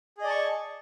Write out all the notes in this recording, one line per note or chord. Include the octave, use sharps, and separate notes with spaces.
G#4 D5 D#5 A5 C#6